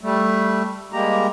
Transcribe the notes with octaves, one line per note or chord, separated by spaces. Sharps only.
G3 A3
G3 G#3 A#3 G4 A#5